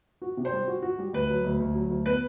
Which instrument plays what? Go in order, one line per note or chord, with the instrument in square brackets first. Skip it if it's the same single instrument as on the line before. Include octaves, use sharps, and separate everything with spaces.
[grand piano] F#4
C3
[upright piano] C5
[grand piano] G3
F#4
F#4
G3
[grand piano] D2 [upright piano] B4
[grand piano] F#3
D2
D2
F#3
D2
[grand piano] B3 [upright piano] B4